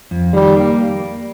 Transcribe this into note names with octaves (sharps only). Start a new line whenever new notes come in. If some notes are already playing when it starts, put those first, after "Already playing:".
F2
D#3 G3
A#3